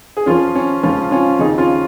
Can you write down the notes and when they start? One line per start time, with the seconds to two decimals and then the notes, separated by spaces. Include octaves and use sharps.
0.17 G#4
0.26 F2 F3 C#4 F4
0.55 C#4
0.83 C#2 C#3 F3 C#4 F4
1.11 C#4 F4
1.39 D#2 C#3 F3 D#4 G#4
1.58 C#4 F4